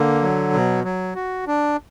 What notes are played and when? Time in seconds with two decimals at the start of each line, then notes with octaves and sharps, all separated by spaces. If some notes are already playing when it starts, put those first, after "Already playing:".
Already playing: D3 A#3
0.22 F#3
0.53 B2
0.84 F#3
1.15 F#4
1.47 D4